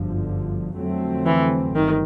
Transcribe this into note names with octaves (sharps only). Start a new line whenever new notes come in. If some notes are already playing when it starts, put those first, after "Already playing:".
Already playing: G1 F#2 D3 F3
F2 D3 F#3 A3 C4
E3
G1 D#3